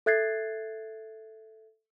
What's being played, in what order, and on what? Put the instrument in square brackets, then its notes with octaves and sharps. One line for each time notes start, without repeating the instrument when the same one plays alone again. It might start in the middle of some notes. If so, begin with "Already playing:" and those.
[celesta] A4 E5 F#6 G#6 A6 C7